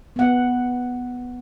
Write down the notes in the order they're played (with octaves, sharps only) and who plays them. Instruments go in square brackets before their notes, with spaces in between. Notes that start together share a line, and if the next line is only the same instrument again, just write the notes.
[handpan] B3 F#5